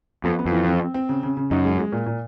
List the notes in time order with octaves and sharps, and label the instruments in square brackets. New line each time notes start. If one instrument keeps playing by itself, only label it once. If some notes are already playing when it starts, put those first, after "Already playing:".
[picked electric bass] F2 [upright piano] B3
[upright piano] B3
[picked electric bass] F2
[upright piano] E3
C4
C4
C4
C#3
C#3
C#3
[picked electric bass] F#2 [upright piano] D#4
[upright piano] G#3
G#3
A#2
A#2